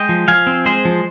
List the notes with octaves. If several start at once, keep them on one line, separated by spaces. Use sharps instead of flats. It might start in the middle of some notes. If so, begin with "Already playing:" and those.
Already playing: G#3 D#5 G5
F3
F3 F5 G#5
C4
G#3 G#4 C5
F3